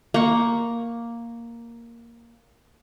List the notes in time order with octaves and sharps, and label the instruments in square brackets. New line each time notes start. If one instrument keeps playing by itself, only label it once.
[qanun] A#3 C#6